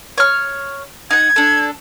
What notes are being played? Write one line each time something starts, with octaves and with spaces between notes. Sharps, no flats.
C#5 F6
D#4 F#5 G#6
D4 A4